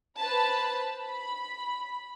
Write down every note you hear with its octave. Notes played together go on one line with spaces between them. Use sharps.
B4 C5 A5 B5
B5